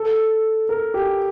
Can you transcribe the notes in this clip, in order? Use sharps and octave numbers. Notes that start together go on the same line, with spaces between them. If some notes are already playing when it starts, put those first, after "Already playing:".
Already playing: A4
A#4
G4